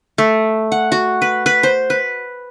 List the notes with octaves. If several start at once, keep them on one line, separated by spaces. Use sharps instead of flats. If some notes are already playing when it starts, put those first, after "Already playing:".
A3
F#5
F#4
B4
B4
C5
B4